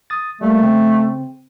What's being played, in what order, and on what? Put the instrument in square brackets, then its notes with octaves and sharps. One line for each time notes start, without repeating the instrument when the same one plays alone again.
[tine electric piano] D#6 A6
[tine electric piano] G3 A#3 [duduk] A3
[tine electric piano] C#3 C4